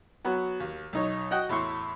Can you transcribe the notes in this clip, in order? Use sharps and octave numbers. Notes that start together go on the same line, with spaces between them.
F#3 B3 F#4
D#2
B1 D#4 C#5
F#4 D#5 F#5 G5
E2 A2 E4 C6 C#6